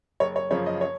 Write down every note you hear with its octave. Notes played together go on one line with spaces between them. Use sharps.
F#1 C#5
C#5
F#2 C#3 F3 C#5
D#5
C#5